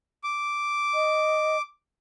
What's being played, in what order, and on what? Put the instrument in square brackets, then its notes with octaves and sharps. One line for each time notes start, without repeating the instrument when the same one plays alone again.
[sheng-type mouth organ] D6
[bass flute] D#5